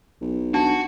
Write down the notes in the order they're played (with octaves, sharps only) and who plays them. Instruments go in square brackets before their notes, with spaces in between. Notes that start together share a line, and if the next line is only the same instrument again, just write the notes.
[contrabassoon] B1
[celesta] D4 A5 [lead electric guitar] F#4